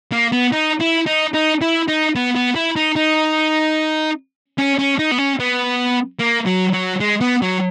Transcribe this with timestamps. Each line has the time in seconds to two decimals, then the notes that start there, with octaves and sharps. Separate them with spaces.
0.12 A#3
0.33 B3
0.53 D#4
0.81 E4
1.07 D#4
1.34 D#4
1.61 E4
1.88 D#4
2.15 B3
2.35 B3
2.55 E4
2.76 D#4
2.96 D#4
4.58 C#4
4.79 C#4
4.99 D#4
5.11 B3
5.18 C#4
5.40 B3
6.20 A#3
6.46 F#3
6.74 F#3
7.00 G#3
7.21 B3
7.42 F#3